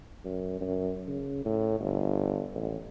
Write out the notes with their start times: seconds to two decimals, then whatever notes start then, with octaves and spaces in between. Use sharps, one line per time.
0.25 F#2
0.61 F#2
1.07 C#3
1.45 A2
1.80 G1
2.55 A1